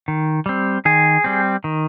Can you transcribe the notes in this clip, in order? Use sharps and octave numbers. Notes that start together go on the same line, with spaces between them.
D#3
G3 C4
D#3 G#4
G3 C4
D#3